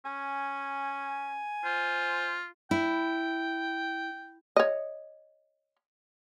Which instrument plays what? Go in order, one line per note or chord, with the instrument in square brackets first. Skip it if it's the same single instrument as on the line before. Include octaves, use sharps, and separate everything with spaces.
[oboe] C#4 [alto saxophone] G#5
[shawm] F4 [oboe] C5
[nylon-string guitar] E4 [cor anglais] G5
[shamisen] C#5 D#5